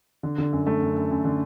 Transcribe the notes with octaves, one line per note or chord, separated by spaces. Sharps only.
D3
D3
F#2
A3
F#2
F#2
F#2
D3